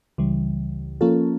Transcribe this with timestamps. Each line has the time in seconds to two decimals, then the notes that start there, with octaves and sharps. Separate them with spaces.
0.18 C#2 C#3 E3 G3
1.01 F3 A#3 C#4 F4 A4